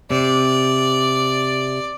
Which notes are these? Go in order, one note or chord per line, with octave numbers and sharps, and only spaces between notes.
C3 D5